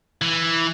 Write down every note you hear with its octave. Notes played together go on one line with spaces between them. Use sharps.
E3